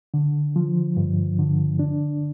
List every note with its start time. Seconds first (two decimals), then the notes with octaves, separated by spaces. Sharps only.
0.14 D3
0.56 F3
0.97 G2
1.39 D3
1.79 D4